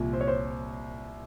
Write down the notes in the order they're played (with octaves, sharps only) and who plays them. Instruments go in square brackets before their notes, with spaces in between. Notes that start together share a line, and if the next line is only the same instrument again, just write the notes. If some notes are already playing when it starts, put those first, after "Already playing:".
Already playing: [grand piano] C2 A#2 F3
C5
C#5
C5